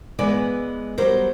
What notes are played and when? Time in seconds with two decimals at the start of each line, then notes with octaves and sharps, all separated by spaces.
0.19 E3 G#3 B3 B4 D5
0.98 F#3 G3 B3 A#4 C5